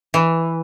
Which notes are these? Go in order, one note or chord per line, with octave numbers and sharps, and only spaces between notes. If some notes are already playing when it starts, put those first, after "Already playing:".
E3